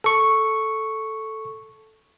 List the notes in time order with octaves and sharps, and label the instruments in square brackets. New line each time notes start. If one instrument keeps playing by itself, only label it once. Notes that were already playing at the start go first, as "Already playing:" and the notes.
[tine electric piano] A4 C#6